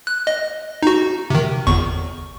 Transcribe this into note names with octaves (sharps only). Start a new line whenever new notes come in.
F#6
D#5
D#4 F#4
C3 D#3
G1 E2 C#6